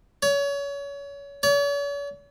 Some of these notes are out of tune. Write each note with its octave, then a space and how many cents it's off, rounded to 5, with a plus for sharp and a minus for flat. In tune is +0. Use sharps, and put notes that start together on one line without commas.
C#5 +30
C#5 +45